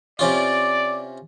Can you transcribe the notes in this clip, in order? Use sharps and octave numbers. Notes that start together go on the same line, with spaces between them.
C3 C#4 F4 D5